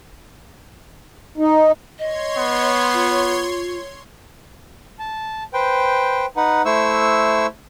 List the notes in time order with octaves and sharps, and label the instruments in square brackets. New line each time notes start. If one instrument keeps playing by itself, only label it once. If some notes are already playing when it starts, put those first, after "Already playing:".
[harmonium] D#4
[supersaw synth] C#5 C6 G#6 [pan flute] D#5
[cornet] B3
[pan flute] F4
[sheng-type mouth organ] A5
B4 C5 G5
D#4 B4 F#5
A3 E4 C5 C#6 E6